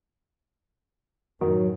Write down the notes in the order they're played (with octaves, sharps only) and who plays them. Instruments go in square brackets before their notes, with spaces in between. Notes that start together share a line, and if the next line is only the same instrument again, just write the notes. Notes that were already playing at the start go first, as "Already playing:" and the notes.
[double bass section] F#2 A2 [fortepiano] D#3 [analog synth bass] F#3